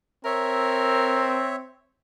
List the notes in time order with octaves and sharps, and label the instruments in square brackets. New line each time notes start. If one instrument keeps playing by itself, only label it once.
[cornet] C4 [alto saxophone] A#4 [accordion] C#5 E5